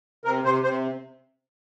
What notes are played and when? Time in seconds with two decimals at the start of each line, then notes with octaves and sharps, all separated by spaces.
0.25 C3 A#4
0.44 C3 C5
0.63 C3 C5